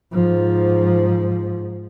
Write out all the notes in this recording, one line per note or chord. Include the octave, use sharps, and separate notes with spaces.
G#2 F3